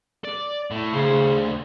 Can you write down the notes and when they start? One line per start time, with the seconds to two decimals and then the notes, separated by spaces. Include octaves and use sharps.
0.25 D5
0.71 A2
0.94 D2 C#3 C5